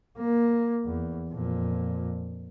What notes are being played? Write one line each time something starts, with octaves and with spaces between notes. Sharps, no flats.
A#3
E2
F2 A#2